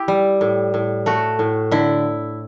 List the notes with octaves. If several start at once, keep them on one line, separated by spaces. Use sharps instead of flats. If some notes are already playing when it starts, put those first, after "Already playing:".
Already playing: E4 G4
G3
A2
A2
A3 F#4
A2
D3 E4